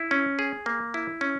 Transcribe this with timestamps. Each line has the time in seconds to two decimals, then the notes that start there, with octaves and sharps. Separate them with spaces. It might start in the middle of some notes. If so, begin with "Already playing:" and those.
Already playing: E4
0.11 C#4
0.39 G#4
0.66 A#3
0.94 E4
1.21 C#4